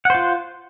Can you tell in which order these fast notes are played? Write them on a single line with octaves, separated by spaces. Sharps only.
F#5 C5 F4